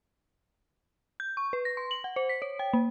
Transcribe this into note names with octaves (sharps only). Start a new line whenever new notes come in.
G6
C#6
B4
A#6
C6
F#7
F#5
C5
B6
C#5
G5
A#3